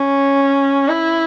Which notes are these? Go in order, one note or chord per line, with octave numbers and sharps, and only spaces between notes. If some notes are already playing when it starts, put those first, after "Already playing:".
Already playing: C#4
E4